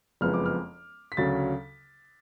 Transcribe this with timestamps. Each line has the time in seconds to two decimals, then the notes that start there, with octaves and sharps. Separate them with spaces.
0.21 F#1 F2 F3 G#3 B3 F6
0.34 D6
0.46 F6
1.12 B6
1.17 D2 C#3 F#3 A6